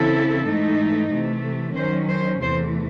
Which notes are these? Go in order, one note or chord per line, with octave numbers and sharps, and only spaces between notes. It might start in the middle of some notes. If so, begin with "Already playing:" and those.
Already playing: C#3 E3 C4 E4 A4
G#2 E3 A3 D#4
C3 E3 A3
D#3 F#3 C#4 C5
C5
E2 C3 E3 A3 C5